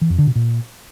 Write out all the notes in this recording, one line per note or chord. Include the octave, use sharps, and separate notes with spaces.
E3
F2
D3
B2
A#2